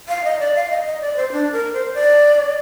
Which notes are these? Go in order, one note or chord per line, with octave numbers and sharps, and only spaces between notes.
F5
D#5
D5
F5
D#5
D#5
D5
C5
D4
A#4
C5
D5